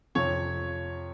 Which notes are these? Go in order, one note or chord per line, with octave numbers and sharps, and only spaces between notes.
F2 C3 F3 C#5